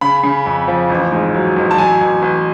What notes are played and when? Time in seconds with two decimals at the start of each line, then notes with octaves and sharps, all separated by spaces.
0.01 C#3 B5
0.23 C#3
0.46 F2
0.68 F3
0.90 A1
1.12 G#2
1.34 F#3
1.56 A1
1.71 A5
1.78 F#3 G#5
2.01 A1
2.22 A1